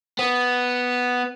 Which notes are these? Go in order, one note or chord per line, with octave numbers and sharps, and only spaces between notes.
B3